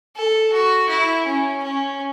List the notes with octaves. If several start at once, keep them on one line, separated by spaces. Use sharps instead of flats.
A4
F#4
E4
C#4
C#4